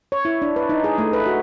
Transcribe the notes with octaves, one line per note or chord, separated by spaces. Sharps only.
C#5
E4
D4
B4
D#4
G#4
A3
B4
F#4